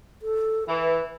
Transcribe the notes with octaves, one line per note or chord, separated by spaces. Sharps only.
A4
E3 B4